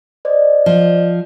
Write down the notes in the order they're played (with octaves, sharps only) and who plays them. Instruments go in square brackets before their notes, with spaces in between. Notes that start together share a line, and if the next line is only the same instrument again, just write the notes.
[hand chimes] C5 D5 D#5
[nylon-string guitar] F3